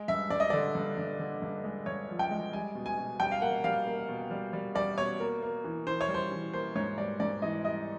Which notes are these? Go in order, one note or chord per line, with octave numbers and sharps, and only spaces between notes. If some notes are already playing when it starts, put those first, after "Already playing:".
Already playing: G#3
G2 E5
G2 D5
D#5
D3 D5
G2
G2
D3
G2
G#3
G2 C#5
F3
G5
G#3
G3 G#5
B2
G#5
B2
G3 G5
F5
A#3 F#5
G3 F5
A#3
B2
G3
G3
G3 D5
B2 C#5
A#3
A#3
E3
E3 C5
C#5
G3
C5
E3
A#3 C5
G#2 C#5
G3 D5
G#2 D5
E3 D#5
G3 D#5